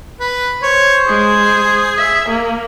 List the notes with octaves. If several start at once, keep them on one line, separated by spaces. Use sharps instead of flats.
B4
C5 C#5
G#3 G#4
E5
A#3